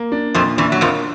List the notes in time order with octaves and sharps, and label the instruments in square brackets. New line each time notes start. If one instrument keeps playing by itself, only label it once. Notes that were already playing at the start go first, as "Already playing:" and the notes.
Already playing: [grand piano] A#3
D4
[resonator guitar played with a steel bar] F2 F3 [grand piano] A#2
[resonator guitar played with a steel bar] E2 E3 [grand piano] D4
[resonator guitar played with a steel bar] F#3
[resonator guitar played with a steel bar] F2 F3 [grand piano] A#3